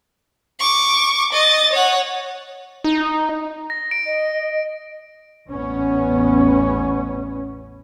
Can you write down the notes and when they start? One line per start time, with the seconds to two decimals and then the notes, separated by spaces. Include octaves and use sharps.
0.60 C#6 D6
1.32 D#5 A6
1.72 C#5 F#5
2.84 D#4
3.70 A#6
3.91 D7
4.06 D#5
5.49 A1 E2 B3 C#4